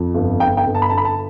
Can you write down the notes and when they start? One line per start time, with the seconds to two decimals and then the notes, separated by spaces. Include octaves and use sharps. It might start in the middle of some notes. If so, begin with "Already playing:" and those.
Already playing: F2
0.14 G1
0.40 G1 G5
0.57 G5
0.66 G1
0.75 A5
0.82 B5
0.90 G1 A5
0.98 B5
1.05 A5